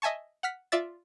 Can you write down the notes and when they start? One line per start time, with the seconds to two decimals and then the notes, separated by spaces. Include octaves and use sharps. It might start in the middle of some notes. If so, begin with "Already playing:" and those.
0.02 D#5 E5 G#5 A5 C#6
0.43 F#5 F6 B6
0.72 F4 D5 E5 A6